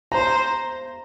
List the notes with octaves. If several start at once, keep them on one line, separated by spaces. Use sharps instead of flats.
C5 A#5